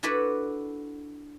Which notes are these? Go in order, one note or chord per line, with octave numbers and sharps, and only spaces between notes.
D4 E4 F#4 A4 B4 D5